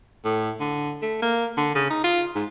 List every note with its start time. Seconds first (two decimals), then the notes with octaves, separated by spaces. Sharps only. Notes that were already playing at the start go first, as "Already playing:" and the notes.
0.25 A2
0.60 D3
1.02 A3
1.22 A#3
1.57 D3
1.75 C#3
1.90 D#4
2.04 F4
2.35 G#2